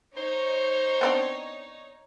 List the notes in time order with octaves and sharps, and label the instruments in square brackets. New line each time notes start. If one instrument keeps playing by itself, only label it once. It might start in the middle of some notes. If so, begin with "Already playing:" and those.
[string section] D#4 C#5 [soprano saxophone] C5
[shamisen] B3 C4 D4